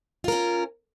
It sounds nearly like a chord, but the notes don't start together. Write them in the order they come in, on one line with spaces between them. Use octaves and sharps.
F4 A#4 C#4